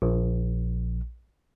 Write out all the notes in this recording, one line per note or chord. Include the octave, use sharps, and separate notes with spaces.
A#1